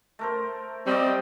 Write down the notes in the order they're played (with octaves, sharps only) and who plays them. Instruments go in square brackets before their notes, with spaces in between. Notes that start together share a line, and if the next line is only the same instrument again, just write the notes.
[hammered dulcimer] A3 A#4 C5
[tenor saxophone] G3 [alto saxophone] C4 [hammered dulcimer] D5 D#5 C#6